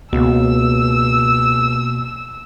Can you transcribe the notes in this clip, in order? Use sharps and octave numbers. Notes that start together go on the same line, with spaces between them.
C#2 B2 A#3 E6